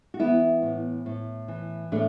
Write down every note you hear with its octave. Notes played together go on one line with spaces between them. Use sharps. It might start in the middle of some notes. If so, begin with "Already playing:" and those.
F#4
E3 B3 E4
A2
A2
E3
A2 A3 D4